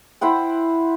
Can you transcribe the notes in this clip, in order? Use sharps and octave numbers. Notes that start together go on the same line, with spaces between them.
E4 C5 F#5 G5